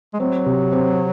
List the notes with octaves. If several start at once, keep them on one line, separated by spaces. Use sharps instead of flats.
G#3
F#3 C4
C3
C4